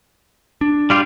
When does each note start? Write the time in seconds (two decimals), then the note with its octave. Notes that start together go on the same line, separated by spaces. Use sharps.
0.61 D4
0.90 G3 F4 G4